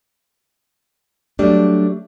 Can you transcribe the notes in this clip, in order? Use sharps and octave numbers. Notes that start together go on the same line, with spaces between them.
F#3 G3 A3 D4